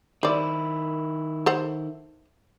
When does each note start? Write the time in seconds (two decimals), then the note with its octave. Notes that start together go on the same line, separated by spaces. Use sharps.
0.23 D#3 E4 C5 D5
1.46 A4 C5 F#5